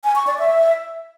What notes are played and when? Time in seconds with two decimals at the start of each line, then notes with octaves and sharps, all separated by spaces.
0.04 G#5
0.16 C#6
0.27 D5
0.38 E5